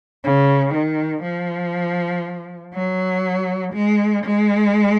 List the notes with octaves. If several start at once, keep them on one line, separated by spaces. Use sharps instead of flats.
C#3
D#3
F3
F#3
G#3
G#3